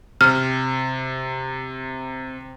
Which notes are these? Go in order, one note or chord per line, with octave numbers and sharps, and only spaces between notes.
C3 F6